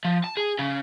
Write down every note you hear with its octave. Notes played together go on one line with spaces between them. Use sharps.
F3
A5
G#4
C#3